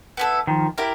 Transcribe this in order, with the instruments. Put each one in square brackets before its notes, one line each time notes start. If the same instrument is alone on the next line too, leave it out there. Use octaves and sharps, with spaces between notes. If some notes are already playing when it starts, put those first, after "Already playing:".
[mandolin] B3 E4 A4
[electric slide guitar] D#3 F3
[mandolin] E4 G4 A#4